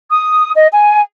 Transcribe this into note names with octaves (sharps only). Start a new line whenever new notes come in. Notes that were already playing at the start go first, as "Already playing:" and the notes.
D#6
D#5
G#5